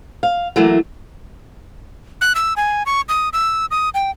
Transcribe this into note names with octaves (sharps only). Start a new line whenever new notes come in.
F5
E3 F#3 A3 A#3
F#6
E6
G#5
C#6
D#6
E6
D#6
G5